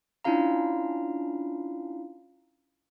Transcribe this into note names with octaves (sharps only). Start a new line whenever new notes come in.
C#4 D4 E4 F4 F5 A#5